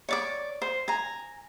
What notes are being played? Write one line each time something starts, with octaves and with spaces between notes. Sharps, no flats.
C#5 D5 D6
C5
G#5 A#5